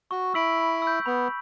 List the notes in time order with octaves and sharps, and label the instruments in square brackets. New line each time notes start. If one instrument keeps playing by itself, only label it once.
[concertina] F#4 [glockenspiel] C#6
[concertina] E4 [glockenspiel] E6 B6 D7 F#7
[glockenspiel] B5
E6
G6
[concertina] B3 [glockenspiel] B5